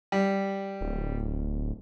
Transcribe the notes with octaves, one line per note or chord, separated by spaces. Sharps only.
G3
D1